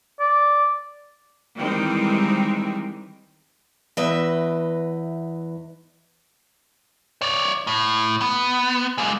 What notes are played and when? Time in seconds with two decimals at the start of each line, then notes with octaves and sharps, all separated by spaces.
0.20 D5
1.57 D#3 E3 G3 G#3 C4 D#4
3.97 E2 B4 D#5 E5
7.22 C#5 D5
7.67 A2
8.21 B3
8.98 G#3 A#3